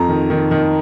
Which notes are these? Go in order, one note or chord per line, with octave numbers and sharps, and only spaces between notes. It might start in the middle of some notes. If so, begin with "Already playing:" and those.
Already playing: F2 A#5
D#3
D#3
D#3